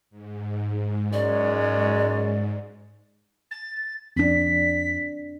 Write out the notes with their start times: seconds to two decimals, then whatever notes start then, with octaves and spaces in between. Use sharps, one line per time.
0.10 G#2
1.13 F#2 G#3 C#5 D5
3.51 A6
4.16 F2 C4 D4 B6